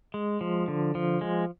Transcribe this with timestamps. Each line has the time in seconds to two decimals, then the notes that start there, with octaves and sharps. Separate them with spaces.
0.14 G#3
0.41 F3
0.68 D3
0.95 F3
1.21 G#3